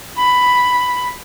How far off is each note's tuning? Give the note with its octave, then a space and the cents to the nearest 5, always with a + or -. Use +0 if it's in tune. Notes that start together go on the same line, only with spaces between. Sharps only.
B5 +5